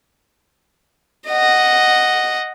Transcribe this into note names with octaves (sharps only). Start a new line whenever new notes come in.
D#5 F#5